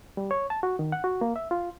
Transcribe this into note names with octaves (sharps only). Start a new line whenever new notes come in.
G3
C#5
A5
F#4
D#3
F#5
F#4
A#3
E5
F4